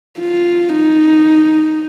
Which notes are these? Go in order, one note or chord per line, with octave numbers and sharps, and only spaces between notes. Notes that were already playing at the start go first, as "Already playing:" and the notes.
F4
D#4